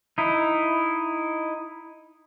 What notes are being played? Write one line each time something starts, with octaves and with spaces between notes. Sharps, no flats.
D#4 E4